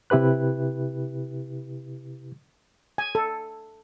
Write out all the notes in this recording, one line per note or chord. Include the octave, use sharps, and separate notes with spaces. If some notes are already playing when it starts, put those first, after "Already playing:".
C3 E4 G4 B4 F#6
G#5
A4